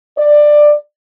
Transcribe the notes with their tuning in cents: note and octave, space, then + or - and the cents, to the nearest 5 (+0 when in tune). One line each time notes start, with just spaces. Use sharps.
D5 +15